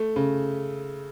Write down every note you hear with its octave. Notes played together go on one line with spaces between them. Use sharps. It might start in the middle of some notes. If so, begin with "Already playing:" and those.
Already playing: A3
C#3